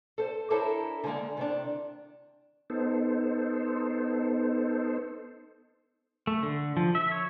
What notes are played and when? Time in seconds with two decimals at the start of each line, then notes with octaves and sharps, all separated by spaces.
0.18 A4 C5
0.50 D4 E4 A4 A#4 C5 C#5
1.04 D3 G3 G#3 A#3
1.37 C3 D#3 D4
2.70 B3 D#4 A4 C5
6.27 A3
6.43 D3
6.77 F3
6.95 E5
7.12 C#5